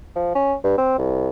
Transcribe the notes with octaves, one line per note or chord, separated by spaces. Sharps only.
F3
C#4
G2
C4
C2